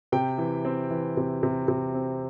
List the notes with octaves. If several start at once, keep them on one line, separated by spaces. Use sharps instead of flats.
C3 G5
E3
C4
E3
C3
C3
C3
C4